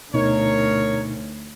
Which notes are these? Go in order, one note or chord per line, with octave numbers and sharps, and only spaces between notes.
D2 B2 D#4 A#4 C#5